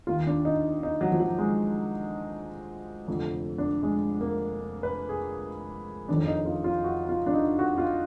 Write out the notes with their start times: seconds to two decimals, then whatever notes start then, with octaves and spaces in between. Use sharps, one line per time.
0.07 D#2 D#3 F4
0.27 D4
0.45 D#4
0.83 D#4
1.01 F#3
1.12 F3
1.20 F#3
1.38 G#3
3.08 F1 F2 D3 F3
3.58 D4
3.83 G#3
4.21 A#3
4.83 B4
5.09 G#4
6.09 F#1 F2 D#3 D4
6.27 D#4
6.46 F4
6.64 F4
6.84 F#4
7.09 F4
7.26 D4
7.33 D#4
7.59 F#4
7.78 F4